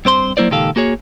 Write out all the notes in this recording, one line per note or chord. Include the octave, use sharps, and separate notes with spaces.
G2 C4 C5 C6
F#3 A#3 E4 C5 D5
C#2 A#2 D#3 G4 A4 F5
A#3 F#4 G#4 C#5